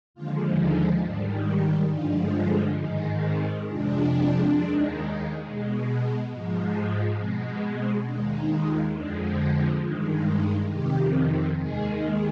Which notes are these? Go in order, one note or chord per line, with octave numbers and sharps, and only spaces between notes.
D#2 D3 F3 G#3 F4
D#4
G#2 D#3 G3 D4
D#4
G2 D3 F3 G#3 F4
F4
G#2 D#3 G#3 D#4
C4
F2 C3 F3 G#3 D4
D#2 D#3 G#3
B2 G#3
G#2 F3 G#3
B2 G#3 C4
B3
C4
D#2 D#3 G#3 D4
D#4
F4
F2 D3 F3 G#3 D4
G2 D#3 G#3
F2 C3 D#3 G4
D#2 D#3 G#3 G#4